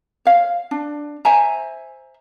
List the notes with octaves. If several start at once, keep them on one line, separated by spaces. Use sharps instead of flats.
C#5 F5
D4
C5 E5 G#5 A#5